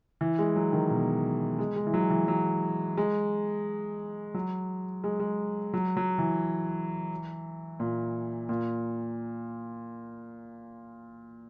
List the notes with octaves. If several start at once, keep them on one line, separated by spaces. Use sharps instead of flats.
E3
G#3
F#3
D#3
B2
G#3
G#3
E3
F#3
E3
F#3
G#3
F#3
G#3
G#3
F#3
F#3
E3
A#2
A#2